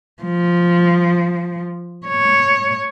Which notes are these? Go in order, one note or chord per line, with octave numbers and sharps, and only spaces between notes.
F3
C#5